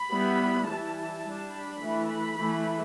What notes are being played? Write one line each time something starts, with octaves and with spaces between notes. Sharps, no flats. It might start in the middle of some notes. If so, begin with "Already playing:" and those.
Already playing: B5
G3 B3 E4
E3 G3 E4 A5
G3 D4
B5
E3 A3 E4
B5
E3 A3 E4